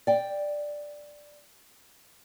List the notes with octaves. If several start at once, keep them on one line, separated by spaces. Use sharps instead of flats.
D5 G5